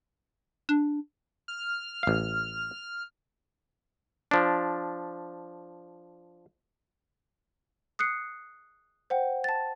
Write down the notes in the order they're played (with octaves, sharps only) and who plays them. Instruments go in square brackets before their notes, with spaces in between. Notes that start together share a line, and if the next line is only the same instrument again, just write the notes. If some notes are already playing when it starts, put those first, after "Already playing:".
[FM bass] D4
[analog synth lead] F6
[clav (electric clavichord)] A1 F5
F3 D4
[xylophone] D#6 F#6 C7 C#7
C5 F#5 G5
A5 A6